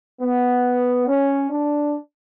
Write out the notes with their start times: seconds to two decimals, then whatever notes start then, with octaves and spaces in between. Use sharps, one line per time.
0.22 B3
1.07 C#4
1.50 D4